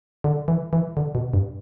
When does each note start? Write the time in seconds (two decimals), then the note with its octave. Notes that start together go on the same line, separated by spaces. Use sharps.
0.24 D3
0.48 E3
0.73 E3
0.97 D3
1.15 B2
1.34 G2